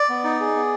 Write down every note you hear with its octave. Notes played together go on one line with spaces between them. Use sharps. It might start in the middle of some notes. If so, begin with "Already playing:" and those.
Already playing: D5
B3
D#4
G#4
B3